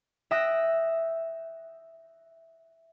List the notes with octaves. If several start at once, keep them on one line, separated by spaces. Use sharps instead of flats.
E5 G5 D#6 F#6 A#6